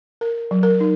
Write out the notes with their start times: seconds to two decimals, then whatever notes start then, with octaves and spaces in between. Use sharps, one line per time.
0.21 A#4
0.51 F#3
0.63 A#4
0.80 D#4